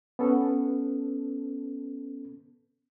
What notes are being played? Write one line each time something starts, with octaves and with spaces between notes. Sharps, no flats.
B3 C#4 A4